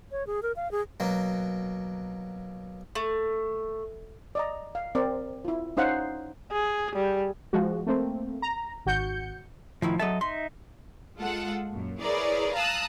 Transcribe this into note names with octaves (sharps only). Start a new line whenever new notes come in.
C#5
G#4
A#4
F5
G#4
B2 F#3 A#3
A3
D5 D#5 A#5
F5
C4 A#4 D5
E4 F4
C#4 D#4 C5 F5 F#5
G#4
G3
F3 G#3 F#4
A3 A#3 C4
A#5
G#1 F#4 G6 C#7
A2 D#3 F3 E4
F#3 A4 D#5 E5 A5
D#4 E5 C6
G#3 F4 A4 F#5
F#2 A#2
E4 G#4 A#4 B4 C#5 D5
F5 A5 A#5 D#6 E6 F#6